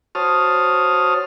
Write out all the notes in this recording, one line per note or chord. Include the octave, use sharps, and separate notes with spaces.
F#4 C5 C#5 A5 D#6 F6